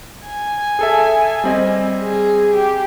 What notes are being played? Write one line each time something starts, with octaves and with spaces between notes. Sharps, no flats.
G#5
G#4 A4 E5
G3 C4 D#5
G#4
G4